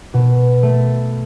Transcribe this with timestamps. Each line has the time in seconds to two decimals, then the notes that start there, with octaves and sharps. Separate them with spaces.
0.14 B2
0.63 A3